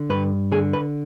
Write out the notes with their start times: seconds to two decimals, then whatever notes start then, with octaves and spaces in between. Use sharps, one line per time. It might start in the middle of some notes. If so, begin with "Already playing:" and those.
Already playing: D3
0.10 G2 B4
0.52 D3 G#4
0.73 B4